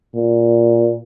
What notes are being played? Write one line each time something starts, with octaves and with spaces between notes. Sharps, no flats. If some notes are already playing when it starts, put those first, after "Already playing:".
A#2